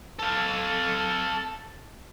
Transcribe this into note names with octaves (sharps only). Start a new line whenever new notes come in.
A4 F5